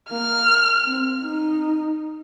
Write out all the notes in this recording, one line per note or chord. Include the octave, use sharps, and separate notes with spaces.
A#3 F6
C4
D#4